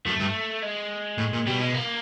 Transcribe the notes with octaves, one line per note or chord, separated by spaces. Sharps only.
F#2 A3
G2
G#3
A2
A#2
B2 G3
G#3
A#3